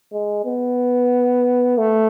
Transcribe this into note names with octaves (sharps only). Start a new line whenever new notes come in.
G#3
B3
A3